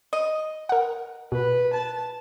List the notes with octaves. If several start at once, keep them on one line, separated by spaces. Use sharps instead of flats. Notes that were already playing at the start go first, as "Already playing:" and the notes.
D#5
A#4 F#5
B2 B4
A5